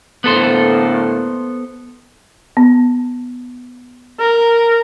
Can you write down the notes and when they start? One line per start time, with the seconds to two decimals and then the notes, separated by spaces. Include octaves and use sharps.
0.24 A2 D3 A#3 B3 A4 C5
2.57 B3
4.20 A#4